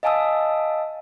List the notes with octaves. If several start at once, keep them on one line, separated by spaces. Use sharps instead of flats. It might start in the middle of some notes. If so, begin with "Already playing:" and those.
D#5 F5 G#5 A5 D#6 E6